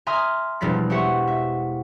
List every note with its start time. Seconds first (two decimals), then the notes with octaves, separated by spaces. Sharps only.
0.07 E5 G#5 A#5 C6 D#6 F6
0.61 E1 F3 G3 D5 B6
0.90 G4 C5 E5 F#5 C#6
1.28 E5